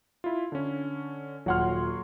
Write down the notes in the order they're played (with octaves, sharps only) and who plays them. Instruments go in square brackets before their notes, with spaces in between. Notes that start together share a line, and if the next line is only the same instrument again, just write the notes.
[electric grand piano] E4 F4
D3 C#4
[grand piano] D#1 F#5 F6 [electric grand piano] F#3 C#5 C6